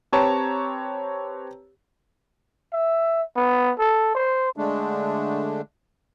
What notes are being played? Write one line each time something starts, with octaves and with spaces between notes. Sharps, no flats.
C4 G4 B4 C#5 A5 A#5
E5
B3
A4
C5
D3 G#3 A3 D4